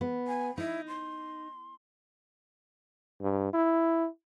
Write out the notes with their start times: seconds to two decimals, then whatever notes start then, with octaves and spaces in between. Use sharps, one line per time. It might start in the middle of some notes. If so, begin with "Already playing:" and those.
0.01 B3
0.27 G#5
0.58 D#4 E4
0.88 C6
3.22 G2
3.53 E4